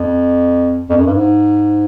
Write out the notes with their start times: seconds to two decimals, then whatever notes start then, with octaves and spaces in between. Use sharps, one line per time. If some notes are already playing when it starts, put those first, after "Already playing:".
Already playing: F2
0.89 F2
0.97 F#2
1.06 G2
1.14 G#2